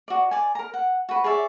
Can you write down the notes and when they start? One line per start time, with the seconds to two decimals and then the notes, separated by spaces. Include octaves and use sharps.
0.08 F#4 D5
0.31 D5 G#5
0.55 A#4 A#5
0.74 F#5
1.09 F#4 B4
1.24 G#4 C#5 D5 E5